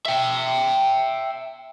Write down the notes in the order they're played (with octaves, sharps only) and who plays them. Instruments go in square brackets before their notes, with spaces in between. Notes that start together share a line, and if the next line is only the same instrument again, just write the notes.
[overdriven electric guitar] E5 G5